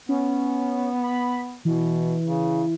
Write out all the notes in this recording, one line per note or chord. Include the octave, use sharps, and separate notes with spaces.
B3 C#4
B5
B2 E3
C#3